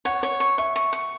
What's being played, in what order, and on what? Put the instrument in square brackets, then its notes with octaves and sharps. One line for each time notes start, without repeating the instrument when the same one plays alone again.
[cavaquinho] C#5 [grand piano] F#5
[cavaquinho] C#5
C#6
[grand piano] E5 [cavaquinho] C#6
[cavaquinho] C#6
C#6